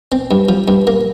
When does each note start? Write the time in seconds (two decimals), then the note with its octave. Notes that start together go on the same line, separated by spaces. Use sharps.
0.12 C4
0.31 G2
0.49 F3
0.68 G2
0.87 A#3